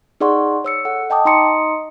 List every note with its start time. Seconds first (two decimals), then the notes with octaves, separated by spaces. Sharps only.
0.21 D#4 G#4 D5 F#5 C6 C#6
0.65 C#5 E6 C#7
0.85 A4 F#5
1.10 D#5 G5 A5 D6 D#6
1.25 D#4 D#5 A#5 C6 D#6 C#7